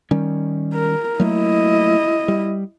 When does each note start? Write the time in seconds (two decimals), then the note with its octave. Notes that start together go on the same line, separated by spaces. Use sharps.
0.11 D#3 G3 C#4
0.74 A#4
1.20 F#3 A3 A#3 E4 D#5
2.28 G3